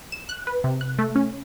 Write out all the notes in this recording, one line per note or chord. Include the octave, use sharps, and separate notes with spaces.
E7
F#6
B4
C3
F#6
A3
C#4